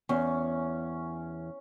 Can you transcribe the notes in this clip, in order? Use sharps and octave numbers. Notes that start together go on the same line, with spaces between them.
E2 C#4